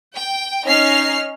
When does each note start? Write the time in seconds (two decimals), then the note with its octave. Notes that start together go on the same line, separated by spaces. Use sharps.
0.13 G5
0.65 C#4 D#4 F6 C7